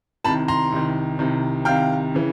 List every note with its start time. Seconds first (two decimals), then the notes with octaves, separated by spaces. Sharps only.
0.24 C2 C3 D#3 A5 B5
0.48 A#5 C6
0.72 C2 C3 D#3
1.19 C2 C3 D#3
1.65 C2 C3 D#3 F5 G5
2.15 C#3 E3